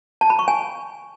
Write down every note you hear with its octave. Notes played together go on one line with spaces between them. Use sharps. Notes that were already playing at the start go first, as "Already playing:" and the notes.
A5
B5
C#6
G#5